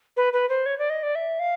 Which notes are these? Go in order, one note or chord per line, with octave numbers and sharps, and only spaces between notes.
B4
B4
C5
C#5
D5
D#5
D5
E5
F5